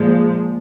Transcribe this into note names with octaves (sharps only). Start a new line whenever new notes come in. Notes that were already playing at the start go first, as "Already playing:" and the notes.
Already playing: A#2 F3 G#3